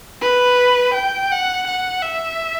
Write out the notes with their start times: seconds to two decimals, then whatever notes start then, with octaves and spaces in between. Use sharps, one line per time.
0.21 B4
0.94 G5
1.31 F#5
1.66 F#5
2.03 E5